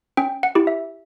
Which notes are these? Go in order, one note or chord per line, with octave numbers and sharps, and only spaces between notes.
C#4 G5
F#5
E4 G4
E5